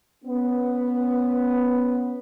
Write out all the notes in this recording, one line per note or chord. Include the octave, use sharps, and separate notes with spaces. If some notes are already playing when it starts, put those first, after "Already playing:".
B3 C#4